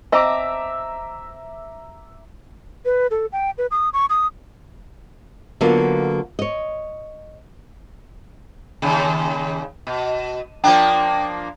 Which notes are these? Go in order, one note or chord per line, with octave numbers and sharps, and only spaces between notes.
C4 D#5 E5 A5 A#5 D6
B4
A4
G5
B4
D#6
C#6
D#6
D3 F#3 A#3 B3 F4
C#5 D#5
D#2 C#3
B2
F3 A#3 D4 G5